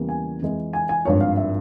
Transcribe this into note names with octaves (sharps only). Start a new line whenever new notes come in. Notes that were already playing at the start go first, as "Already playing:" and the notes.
Already playing: E2 C#3 E3 G3 A#3
G#5
F2 E3 G#3
G#5
G#5
G#1 G2 F3 C#5
F5
E5